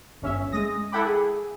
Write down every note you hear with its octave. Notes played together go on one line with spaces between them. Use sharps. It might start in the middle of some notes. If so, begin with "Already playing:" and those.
G1 C#4 E5
G#3 D#6 A#6
E4 A4 F#5 G5 B5 D6
G#4